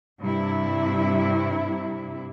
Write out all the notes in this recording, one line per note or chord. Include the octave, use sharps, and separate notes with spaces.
G2 C3 E4